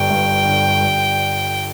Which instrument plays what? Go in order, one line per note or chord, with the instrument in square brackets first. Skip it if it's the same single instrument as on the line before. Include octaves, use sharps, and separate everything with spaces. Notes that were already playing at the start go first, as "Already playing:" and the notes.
Already playing: [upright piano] G1 G3 [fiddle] G5
[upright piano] G2
D3
G3